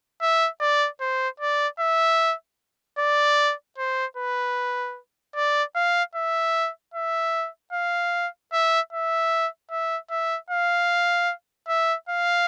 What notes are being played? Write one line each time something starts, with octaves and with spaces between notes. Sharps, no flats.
E5
D5
C5
D5
E5
D5
C5
B4
D5
F5
E5
E5
F5
E5
E5
E5
E5
F5
E5
F5